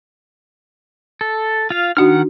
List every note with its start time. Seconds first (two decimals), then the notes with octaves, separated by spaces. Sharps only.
1.21 A4
1.70 F4 F5
1.97 D#3 D4 D#4 F#4 F#5 F6